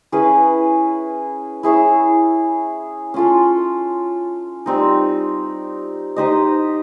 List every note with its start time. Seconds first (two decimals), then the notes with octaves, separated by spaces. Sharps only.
0.12 C#4 E4 G#4 B4
1.63 E4 G#4 C#5 E5
3.14 C#4 F4 A4
4.66 G3 C4 D#4
6.16 D#4 G4 C5 D#5